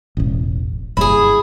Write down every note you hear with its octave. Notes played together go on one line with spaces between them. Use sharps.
E1 A1
F#1 G2 E4 G#4